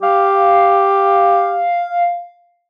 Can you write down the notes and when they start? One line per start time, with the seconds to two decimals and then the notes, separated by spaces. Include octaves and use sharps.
0.03 G4 F5